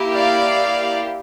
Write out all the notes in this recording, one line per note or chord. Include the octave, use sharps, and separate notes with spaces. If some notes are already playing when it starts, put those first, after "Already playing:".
Already playing: A#3 E4 G4
D5 F5